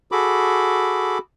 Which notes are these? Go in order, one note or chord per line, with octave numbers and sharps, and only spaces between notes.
F#4 G#4 A4 B5 D6